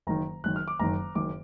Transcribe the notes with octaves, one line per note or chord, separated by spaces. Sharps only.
F#1 F#2 D#3 A#5
F#1 F#2 D#3 F#6
F6
D6
F#1 F#2 D#3 A#5
F#1 F#2 D#3 D6